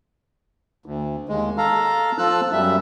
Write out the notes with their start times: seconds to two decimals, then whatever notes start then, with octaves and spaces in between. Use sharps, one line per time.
0.86 D2
1.29 D#2 G#3
1.58 A4 F5 A#5
2.18 F3 F4 A4 E6 F#6
2.52 F#2 G3 E5